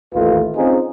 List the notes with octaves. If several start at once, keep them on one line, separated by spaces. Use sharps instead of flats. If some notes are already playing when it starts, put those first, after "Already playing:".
A1 D#2 D#3 A3 F4 B4
C4 C#4 D#4 F4 G#4